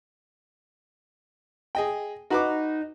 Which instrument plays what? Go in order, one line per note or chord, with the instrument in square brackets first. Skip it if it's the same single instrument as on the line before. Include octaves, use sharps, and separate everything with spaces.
[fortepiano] G#4 D#5 G5
[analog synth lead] D#4 [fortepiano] F#4 B4 D6